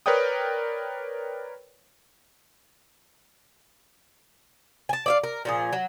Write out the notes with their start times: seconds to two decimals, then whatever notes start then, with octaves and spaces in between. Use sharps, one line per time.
0.06 A#4 B4 C#5 D5 G5 D#6
4.89 G#5 A5
5.06 D5 E5 F5
5.24 A#4
5.45 A#2 F3 G#4
5.73 F#3